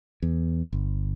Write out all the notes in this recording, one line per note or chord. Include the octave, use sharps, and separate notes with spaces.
E2
G1